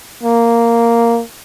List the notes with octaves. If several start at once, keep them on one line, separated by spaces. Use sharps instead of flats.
A#3